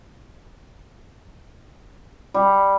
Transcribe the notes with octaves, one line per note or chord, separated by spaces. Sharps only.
G3